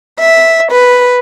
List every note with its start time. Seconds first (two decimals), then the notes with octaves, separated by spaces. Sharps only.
0.19 E5
0.69 B4